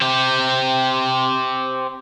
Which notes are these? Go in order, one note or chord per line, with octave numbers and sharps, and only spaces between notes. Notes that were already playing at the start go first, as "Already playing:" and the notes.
C4 G4